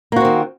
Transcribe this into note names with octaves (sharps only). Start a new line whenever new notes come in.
D#3 A#3 C4 F#4